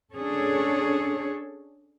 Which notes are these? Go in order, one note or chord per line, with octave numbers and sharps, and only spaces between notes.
C#4 D4 G#4 A4 C#5